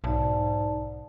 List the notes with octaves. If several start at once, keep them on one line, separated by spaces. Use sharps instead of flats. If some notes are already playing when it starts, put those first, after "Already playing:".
B1 G#2 D5 A5